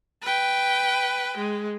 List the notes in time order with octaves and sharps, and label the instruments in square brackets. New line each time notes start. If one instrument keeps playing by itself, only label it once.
[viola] B4 G5
G#3